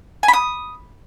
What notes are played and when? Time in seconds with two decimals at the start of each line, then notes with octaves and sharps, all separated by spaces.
0.23 G#5
0.28 B5
0.33 D#6